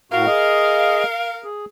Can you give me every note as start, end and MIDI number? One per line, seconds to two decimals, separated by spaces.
0.12 0.26 45
0.12 0.26 66
0.12 1.46 70
0.12 1.46 77
0.27 1.03 68
0.27 1.03 75
1.44 1.65 68